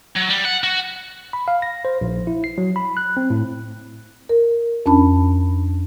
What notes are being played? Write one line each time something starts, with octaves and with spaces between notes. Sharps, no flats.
F#3
G3
F#5
F#4
B5
F5
A#6
C5
A#1
E4
C7
F#3
B5
F#6
C4
A2
A#4
F2 C#4 D4 A5 B5